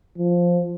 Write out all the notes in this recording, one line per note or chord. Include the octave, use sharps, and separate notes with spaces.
F3